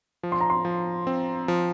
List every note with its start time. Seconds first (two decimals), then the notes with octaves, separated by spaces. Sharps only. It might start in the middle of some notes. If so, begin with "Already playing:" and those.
0.23 F3
0.32 C6
0.40 A#5
0.50 C6
0.65 F3
1.07 C4
1.48 F3